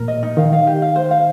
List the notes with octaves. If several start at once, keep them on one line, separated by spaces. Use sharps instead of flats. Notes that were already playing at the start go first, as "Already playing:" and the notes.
Already playing: A#2 A#4
D#5
D#4
D#3 F5
F5
G4
F5
C5
F5